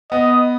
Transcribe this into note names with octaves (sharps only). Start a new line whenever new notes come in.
B3 D#5